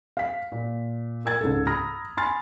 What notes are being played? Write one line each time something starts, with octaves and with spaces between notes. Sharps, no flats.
F5 B6
A#2
A#4 E6 G#6 A6
C#2 G#2 A4
A#5 B5 D#6 F6 A#6
G#5 B5 C6 F6 A6